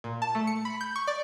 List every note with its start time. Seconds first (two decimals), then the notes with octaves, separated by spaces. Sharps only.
0.04 A#2
0.22 A5
0.35 A3
0.47 C#7
0.65 B5
0.81 G6
0.96 C#6
1.07 D5